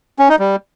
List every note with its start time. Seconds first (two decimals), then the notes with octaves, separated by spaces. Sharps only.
0.19 C#4
0.29 D#4
0.39 G3